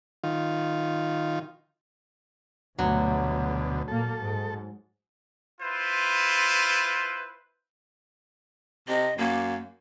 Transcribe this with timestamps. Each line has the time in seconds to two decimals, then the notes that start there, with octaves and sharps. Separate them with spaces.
0.24 D#3 F4
2.79 D2 G2 B2 F#3 A3
3.88 A#2 A#3 A4
4.18 G#2
5.60 E4 F4 B4 C5
8.89 C3 D#5
9.18 F#2 A#3